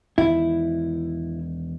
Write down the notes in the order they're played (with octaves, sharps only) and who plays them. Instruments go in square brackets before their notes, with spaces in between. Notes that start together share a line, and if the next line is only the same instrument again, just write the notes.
[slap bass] E1 D#3 [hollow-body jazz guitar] E4